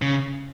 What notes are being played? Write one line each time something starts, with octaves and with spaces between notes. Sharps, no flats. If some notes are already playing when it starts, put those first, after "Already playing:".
C#3